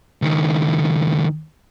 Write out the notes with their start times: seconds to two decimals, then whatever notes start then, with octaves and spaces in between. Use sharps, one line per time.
0.22 C#2 D#3